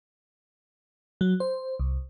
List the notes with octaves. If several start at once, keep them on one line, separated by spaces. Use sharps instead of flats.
F#3
C5
C2